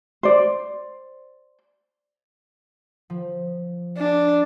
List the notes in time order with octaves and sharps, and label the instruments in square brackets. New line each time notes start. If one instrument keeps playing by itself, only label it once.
[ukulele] C5 D5
[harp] F3
[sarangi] D4